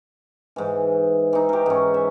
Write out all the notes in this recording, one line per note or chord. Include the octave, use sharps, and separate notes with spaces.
G#2 E3
E3 D#4
G4 A#4
G#2 C#4
E5